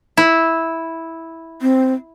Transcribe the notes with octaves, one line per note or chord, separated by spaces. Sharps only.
E4
C4